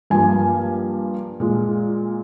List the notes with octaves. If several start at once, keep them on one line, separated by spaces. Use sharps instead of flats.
G2 F3 A#3 G#5
A#2 G#3